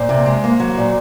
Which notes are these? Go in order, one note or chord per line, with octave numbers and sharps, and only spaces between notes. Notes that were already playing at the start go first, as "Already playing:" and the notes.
Already playing: A#2 C5
C3
G#3
A#3
F#3
A#2